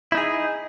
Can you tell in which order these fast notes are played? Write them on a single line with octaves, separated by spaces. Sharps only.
E4 D#4 G#4